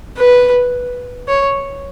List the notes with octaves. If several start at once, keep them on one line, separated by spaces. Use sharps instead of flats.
B4
C#5